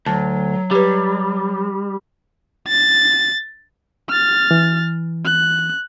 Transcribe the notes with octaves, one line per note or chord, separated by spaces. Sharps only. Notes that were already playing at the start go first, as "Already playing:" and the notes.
D2 F#3 A5
G3 G4 B4
A6
F6 A6
E3
F#6